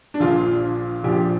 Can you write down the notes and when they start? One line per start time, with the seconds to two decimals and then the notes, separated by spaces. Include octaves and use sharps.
0.14 D4
0.20 A#1 A#2 F3 F4
1.04 A#1 A#2 F3 G4